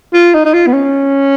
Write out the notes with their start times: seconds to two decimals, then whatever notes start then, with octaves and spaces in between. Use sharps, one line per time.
0.14 F4
0.34 D#4
0.45 D#4
0.54 F4
0.67 B3
0.73 C#4